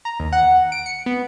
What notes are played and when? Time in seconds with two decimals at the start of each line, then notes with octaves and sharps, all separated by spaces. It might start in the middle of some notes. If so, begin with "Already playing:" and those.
0.05 A#5
0.20 D#2
0.32 F#5
0.72 D7
0.86 C#7
1.06 B3